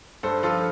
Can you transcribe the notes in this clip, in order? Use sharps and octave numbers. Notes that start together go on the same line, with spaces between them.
G2 A4 C5
F3 F4 A4